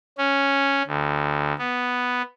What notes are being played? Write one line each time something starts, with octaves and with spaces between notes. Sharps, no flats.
C#4
D2
B3